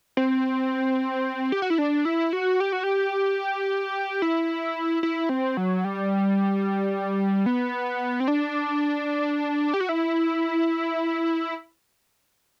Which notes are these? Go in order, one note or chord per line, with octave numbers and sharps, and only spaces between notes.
C4
G4
F#4
E4
D4
E4
F#4
G4
F#4
G4
E4
E4
C4
F#3
G3
B3
C4
D4
G4
F#4
E4